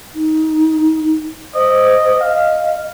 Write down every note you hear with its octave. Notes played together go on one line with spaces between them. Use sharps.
D#4
C5 D#5
D#5 F5